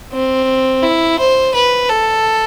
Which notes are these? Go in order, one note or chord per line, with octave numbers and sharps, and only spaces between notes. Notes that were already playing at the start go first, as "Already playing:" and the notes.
C4
E4
C5
B4
A4